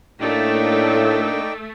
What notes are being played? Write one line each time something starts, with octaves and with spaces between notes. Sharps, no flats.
A2 A3 A#3 D4 D#4 D5 G5